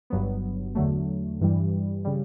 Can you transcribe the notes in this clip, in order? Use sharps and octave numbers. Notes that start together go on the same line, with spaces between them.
G1 G2 F#3 B3
E2 D3 F#3 A3
G2 E3 G3
C#3 G3